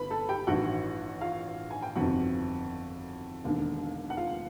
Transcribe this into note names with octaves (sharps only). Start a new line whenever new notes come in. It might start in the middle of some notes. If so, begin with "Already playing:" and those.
Already playing: G1 B4 B5
A4 A5
G4 G5
A1 G2 D#3 F#4 F#5
F4 F5
G#5
G5
G1 F2 C3 D#3 F#4 F#5
E1 D#2 D3
F#5
F4 F5